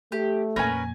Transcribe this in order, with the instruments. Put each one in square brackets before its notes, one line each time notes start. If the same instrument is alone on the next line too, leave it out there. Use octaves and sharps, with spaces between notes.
[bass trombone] A3 [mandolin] G4
[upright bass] F2 A#2 [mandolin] C#4 A#4 B4 [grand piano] G#5 G#6 A#6